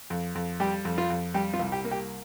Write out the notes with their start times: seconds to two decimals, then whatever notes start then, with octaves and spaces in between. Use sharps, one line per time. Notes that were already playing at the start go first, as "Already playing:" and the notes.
0.10 F2
0.35 F2
0.60 G3 G4
0.85 F2
0.98 F4
1.10 F2
1.34 G3 G4
1.54 F4
1.59 C2
1.72 G4
1.84 A#3
1.91 G4